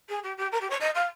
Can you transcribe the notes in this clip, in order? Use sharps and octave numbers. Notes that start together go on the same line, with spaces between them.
G#4
G4
G4
A#4
G4
C#5
D#5
F5